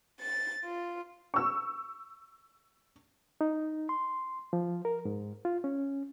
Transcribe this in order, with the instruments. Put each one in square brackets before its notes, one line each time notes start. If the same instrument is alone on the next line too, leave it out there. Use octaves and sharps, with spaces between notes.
[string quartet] A6
F4
[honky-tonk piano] C#6 E6
[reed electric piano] D#4
C6
F3
A#4
G#2
F4
C#4